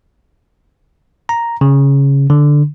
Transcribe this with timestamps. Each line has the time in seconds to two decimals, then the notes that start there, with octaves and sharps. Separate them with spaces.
1.29 A#5
1.61 C#3
2.30 D3